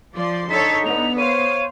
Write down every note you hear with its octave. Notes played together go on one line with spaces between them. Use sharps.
F3 D5 C6
D3 D#4 A4 C#5 B6
B3 F7
C5 C#5 F5 D#7